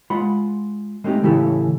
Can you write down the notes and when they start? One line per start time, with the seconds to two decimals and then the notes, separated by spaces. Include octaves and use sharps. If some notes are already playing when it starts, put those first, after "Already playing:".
0.10 G#3 F4 F#5 B5 C6
1.04 G#3 A3 C4 D#4 G4
1.23 A2 C#3 E3 E4 G4 A4